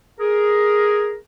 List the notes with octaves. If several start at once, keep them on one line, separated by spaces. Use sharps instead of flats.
G#4 A#4